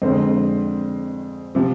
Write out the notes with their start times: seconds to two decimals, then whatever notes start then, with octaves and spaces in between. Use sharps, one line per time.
0.02 F2 D3 G#3 C4 C5
1.55 C3 F3